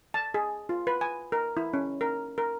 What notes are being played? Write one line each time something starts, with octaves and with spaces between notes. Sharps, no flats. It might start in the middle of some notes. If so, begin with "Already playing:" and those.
A5
G#4
F4
B4
G#5
A#4
E4
C#4
A#4
A#4